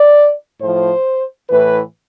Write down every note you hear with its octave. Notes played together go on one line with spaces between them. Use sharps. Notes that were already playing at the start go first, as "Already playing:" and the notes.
Already playing: D5
A2 F3 C5
A2 E3 B4